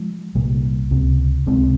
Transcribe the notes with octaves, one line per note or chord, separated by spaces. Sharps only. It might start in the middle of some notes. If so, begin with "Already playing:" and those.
Already playing: F3 G#3
C2 A#2 G3 A#3
C#2 C3
C#2 C3 G#3 C4